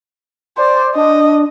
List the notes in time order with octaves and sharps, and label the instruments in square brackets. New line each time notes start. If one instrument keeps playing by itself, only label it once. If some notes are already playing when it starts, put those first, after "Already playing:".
[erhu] C5 [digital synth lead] D5
[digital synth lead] D4 [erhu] D#5